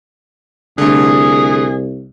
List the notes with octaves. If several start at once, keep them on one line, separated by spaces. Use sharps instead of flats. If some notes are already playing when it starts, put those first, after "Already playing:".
C2 D3 A3 G#4